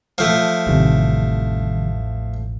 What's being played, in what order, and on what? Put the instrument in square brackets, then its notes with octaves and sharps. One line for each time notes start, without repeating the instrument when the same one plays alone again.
[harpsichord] F3 A3
[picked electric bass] A1 E2 [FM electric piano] C3 D#3 G3